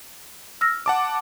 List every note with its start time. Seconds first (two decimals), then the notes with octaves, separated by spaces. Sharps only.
0.61 E6 F6 A#6
0.86 F#5 A5 D6